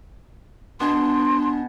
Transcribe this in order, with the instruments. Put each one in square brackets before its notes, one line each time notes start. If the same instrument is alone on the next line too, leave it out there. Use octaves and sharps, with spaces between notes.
[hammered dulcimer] B2 G#5 [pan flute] D4 [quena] C6